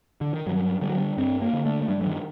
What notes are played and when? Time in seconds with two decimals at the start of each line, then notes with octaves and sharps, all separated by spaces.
0.21 D3
0.34 D#3
0.46 G2 F#3
0.81 D3 G3
0.89 F#3
0.98 G3
1.17 G2 C4
1.42 A#3
1.53 D3
1.66 A3
1.82 A3
1.88 G2 G3
2.01 F#3
2.07 D#3